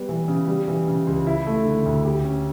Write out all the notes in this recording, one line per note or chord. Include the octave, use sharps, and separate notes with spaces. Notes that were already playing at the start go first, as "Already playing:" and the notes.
Already playing: G3 B3
E3
C#3
G3
E3
C#3
C#2
E4
A3
D3
D2
G4
C#4